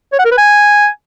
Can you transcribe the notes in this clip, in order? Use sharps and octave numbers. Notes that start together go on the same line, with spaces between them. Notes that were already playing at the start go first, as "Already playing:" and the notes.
C#5
F#5
A#4
B4
G#5